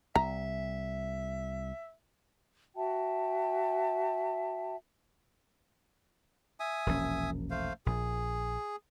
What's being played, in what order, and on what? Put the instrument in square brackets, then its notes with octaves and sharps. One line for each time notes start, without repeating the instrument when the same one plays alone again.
[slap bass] C2 [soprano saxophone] E5 [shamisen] A#5
[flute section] F#4 E5 G5 A5
[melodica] E5 G#5 D#6
[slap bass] E1 A#1 C#4
[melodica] A3 C5 F5
[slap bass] A#1 [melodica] G#4